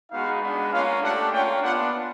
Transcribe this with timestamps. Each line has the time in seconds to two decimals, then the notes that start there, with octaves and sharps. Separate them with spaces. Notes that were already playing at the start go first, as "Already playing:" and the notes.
0.11 G#3 B3 D#4 F#4 F5
0.41 G#3 B3 D4
0.71 A#3 C#4 F4 F5
1.02 A3 D4 G4 F#5
1.31 A#3 C#4 F4 G5
1.62 B3 D4 F4 F#5